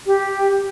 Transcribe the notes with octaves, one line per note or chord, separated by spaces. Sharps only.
G4